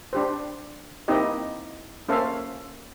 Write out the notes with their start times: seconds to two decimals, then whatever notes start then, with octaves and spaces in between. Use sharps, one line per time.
0.13 D4 G4 C5
1.08 A#3 C4 D#4 E4 G4 D#5
2.09 A#3 C#4 A4 C5 E5 F5